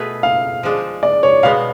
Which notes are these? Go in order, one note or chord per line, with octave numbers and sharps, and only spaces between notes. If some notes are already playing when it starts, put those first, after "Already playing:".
Already playing: B2 A3 F4 G#4 B4
F5
F3 G#3 D4
D5
C#5
B2 G#3 B3 F5